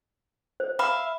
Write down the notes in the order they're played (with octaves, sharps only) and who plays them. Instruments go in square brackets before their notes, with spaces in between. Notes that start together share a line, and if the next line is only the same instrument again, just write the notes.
[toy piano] C5
[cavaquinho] E5 F5 [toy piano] B5